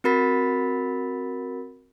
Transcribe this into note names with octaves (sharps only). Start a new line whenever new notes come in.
C4 F#4 A#4 B5 A6 B6